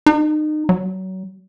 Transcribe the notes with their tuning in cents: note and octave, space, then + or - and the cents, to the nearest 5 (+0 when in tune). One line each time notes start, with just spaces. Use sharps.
D#4 -30
F#3 +25